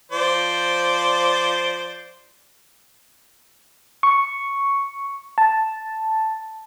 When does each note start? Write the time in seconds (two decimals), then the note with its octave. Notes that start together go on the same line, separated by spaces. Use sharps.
0.12 F3 C5 D5
4.03 C#6
5.38 A5